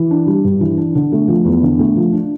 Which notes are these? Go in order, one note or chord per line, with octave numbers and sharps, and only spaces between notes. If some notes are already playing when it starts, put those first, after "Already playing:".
Already playing: E3
D4
G3
G2
E3
D4
D3
A3
F3
E2
D3
A3
F3
D4